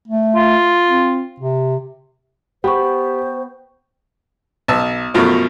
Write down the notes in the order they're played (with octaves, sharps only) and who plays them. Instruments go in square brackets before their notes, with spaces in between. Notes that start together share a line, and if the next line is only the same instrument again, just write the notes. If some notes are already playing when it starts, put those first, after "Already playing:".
[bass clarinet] A3
[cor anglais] F4
[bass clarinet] C4
C3
[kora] B3 [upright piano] G4 [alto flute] C5 [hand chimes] G5 C#6
[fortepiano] B1 A5 E6
F#2 B2 F3 A3